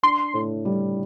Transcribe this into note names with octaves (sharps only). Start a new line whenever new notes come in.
D4 C6
A2
G3